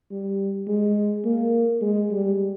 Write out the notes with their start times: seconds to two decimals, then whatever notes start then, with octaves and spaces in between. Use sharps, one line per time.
0.11 G3
0.67 G#3
1.25 A#3
1.82 G#3
2.11 G3